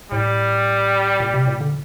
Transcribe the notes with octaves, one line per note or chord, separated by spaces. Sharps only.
A2 G3
A#2
C3
A#2
D3